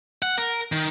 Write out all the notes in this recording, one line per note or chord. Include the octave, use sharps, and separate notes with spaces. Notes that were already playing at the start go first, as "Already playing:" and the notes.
F#5
A#4
D#3